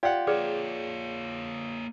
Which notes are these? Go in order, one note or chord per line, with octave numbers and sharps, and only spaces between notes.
F4 G4 D5 F#5
A#3 G#4 B4 C#5 D5